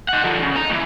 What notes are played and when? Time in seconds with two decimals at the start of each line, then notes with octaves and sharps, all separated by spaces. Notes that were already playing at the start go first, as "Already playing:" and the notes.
0.09 D#4 F#5
0.23 D3 F3
0.42 C#3
0.56 D#5 A#5
0.70 D#2 E3